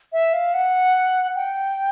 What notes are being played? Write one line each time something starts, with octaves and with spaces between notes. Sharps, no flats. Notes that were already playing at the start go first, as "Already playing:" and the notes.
E5
F5
F#5
G5